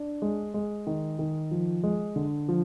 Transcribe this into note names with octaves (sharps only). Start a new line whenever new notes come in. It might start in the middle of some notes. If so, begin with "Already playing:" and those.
Already playing: D4
G#3
G#3
D#3
D#3
F3
G#3
D3
F3